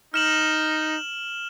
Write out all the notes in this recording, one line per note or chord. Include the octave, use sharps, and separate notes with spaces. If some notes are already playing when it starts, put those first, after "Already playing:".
D#4 F6 E7 F#7